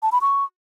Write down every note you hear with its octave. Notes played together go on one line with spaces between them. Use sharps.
A5
B5
C#6